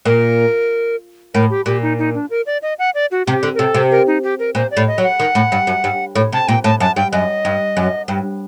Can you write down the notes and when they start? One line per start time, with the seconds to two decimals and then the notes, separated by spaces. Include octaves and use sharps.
0.05 A#2 A#4
1.34 A2 A#4
1.50 G4
1.66 A#2 G4
1.82 D#4
1.99 D#4
2.14 D4
2.30 A#4
2.46 D5
2.62 D#5
2.79 F#5
2.95 D5
3.11 F#4
3.26 C3 G4
3.43 D3
3.55 A#4
3.59 C3 A4
3.74 C3
3.91 A#4
4.07 D#4
4.23 G4
4.39 A#4
4.55 A#2 C5
4.71 D5
4.77 A2
4.87 D#5
4.98 F#3
5.03 F#5
5.20 D#3
5.35 A2
5.52 G2
5.67 F#2
5.84 G2
6.15 A2
6.32 C3 A5
6.48 A#2 G5
6.64 A2 A5
6.80 F#2 A5
6.96 G2 G5
7.12 F#2 D#5
7.45 G2
7.77 F#2
8.08 G2